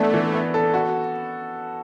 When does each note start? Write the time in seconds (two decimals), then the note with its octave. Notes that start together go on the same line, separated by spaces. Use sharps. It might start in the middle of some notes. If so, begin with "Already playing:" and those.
Already playing: E3 A3 B3 D4 A4
0.14 E3
0.33 B3
0.54 A4
0.74 F#4